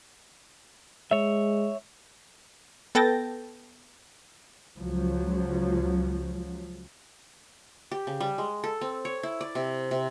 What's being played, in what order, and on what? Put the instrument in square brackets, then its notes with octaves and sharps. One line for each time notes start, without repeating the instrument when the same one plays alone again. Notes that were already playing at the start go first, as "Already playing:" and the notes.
[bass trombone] G#3 [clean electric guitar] C#5 E5
[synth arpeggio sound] B3 A4 G5 A6 A#6
[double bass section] C#2 F3 F#3
[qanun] G4
C#3
G3
G#3
A4
C4
C#5
E4
D5
C3
C3